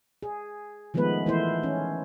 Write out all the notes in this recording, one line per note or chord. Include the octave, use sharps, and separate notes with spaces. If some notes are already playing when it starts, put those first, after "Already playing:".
G#4
D#3 F3 G#3 A3 B3 B4
E3 A3 E4 C5
C#4